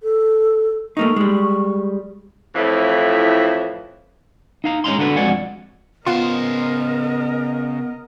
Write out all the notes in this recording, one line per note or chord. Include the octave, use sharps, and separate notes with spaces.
A4
A3 A#3 D#4 C#6
G3 G#3
F2 A2 E3 F3 A3 E4
D#4 F5 A#5
G#3 C#4 D#4 A#5 C6
D3 D4 F#4 B4
F2 G#3 F#4 D5 F#5 G#5
C#3 B3 F4 A#4 C5 D#5 F5 F#5